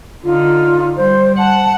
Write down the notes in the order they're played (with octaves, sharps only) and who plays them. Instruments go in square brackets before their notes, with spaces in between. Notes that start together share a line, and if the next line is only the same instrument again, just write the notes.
[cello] D3 D#4 [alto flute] F4
[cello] G3 [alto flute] C5
[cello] F#5 [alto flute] A5